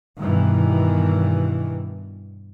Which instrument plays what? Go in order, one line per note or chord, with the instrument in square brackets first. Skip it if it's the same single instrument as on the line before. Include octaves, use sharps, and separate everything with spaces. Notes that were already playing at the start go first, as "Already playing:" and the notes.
[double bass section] G2 B2 D#3 E3